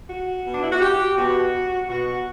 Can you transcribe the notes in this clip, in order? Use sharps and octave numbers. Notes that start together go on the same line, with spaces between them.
F#4
B2
D4
E4
F#4
G4
B2 F#4
B2 F#4